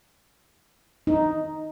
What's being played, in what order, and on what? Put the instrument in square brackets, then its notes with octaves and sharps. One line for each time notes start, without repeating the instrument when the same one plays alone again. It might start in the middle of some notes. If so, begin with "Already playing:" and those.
[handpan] D#4